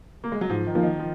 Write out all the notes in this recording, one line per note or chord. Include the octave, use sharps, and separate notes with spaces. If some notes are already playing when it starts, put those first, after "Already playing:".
A#3
G#3
F#3
G#2 F3
D#3
F3 A#3 D#4
D#3
F3